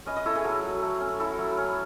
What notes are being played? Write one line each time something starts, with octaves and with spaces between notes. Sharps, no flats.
C#4 B4 D#5
B4 D#5
E4 A4 C#5
G#4 B4
F#3 F#4 A4
F#3
A3
C#4
E4 F#4 A4
F#3
C#4